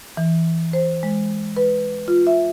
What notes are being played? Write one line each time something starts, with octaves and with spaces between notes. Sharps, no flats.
E3
C5
G#3
B4
F4
E5